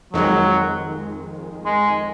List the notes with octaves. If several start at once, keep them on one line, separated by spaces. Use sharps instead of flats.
F2 D#3 F#3 G#3
G#3